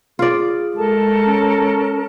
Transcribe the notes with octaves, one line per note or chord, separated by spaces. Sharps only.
F4 G#4 D5
G#3 A4 A#4 A5
C#4